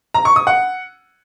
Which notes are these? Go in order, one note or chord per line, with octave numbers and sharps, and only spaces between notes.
A#5
C#6
D#6
F#5